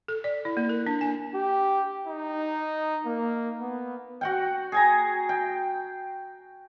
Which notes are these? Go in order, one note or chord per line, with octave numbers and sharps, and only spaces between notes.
A4
D5
E4
A#3
A#4
D4
G#5
G4
D#4
A#3
B3
F#4 F#5 G5
G#4 G#5 A#5
G5